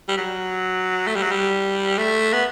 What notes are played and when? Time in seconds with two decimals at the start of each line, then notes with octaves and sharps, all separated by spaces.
0.08 G3
0.17 F#3
1.07 A3
1.15 G3
1.23 F#3
1.31 G3
1.98 A3
2.33 B3